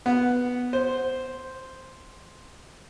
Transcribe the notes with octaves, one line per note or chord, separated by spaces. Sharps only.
B3
C5